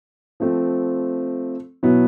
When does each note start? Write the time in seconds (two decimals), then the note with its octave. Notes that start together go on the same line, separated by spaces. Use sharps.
0.40 F3 A3 C4
1.83 B2 F#3 B3 E4